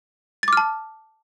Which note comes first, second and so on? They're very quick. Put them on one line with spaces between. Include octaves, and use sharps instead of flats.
A6 D6 F6 A5